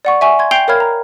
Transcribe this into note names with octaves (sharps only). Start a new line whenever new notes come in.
D5 F#5 C#6
E5 G#5 C#6
C6 G#6
G5 G6 C7 D7 F7 G7
A#4 C#5 F5 B5 F6 G#6
A#5